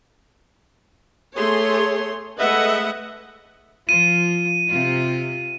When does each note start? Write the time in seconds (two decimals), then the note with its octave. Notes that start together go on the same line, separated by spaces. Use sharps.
1.36 A3 G#4 C#5 C6
2.39 G#3 A3 B4 D#5 E5 F#5
3.89 F3 F4 D#7
4.71 C3 F4